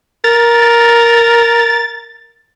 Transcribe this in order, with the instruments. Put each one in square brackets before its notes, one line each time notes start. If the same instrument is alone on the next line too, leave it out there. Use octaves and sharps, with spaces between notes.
[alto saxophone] A#4 [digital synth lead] A6